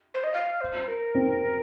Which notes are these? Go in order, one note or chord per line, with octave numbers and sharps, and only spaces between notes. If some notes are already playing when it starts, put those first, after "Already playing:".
C5
D#5
F5
C5
A#4
C4